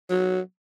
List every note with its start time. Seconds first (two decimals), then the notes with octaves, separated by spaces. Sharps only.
0.10 F#3